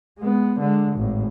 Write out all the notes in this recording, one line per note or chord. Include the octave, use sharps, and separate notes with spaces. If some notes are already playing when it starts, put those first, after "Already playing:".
G#3 B3
D3 G#3
G#1 A2